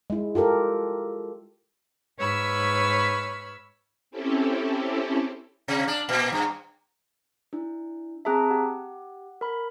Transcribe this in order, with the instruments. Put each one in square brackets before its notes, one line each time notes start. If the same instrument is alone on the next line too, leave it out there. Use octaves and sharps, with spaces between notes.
[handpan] G#3 E4
F4 G4 A4 A#4
[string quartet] G#2 B4 C#5 B5 E6 F6
[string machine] C4 C#4 E4 G4 A4
[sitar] C3
D4
A#2
G2
[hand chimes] D4 E4
[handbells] C4 G#4 E5 [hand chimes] A5 A#5 F#6
[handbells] G4 [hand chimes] F#5
[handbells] A#4 B5